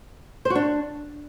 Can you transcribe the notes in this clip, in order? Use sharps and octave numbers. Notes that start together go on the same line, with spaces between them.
C5
F#4
D4